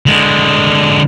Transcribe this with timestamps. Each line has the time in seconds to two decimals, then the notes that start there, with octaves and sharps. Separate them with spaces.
0.06 D3 G#3